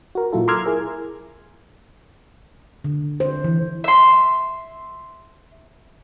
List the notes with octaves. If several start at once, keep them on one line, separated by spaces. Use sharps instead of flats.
F#4 A#4
A#2 F#3 E4 F4 A4
A#5 C6 D6 E6 F6 G#6
E4 G#4 A#4
D3
C5
E3
E5 C6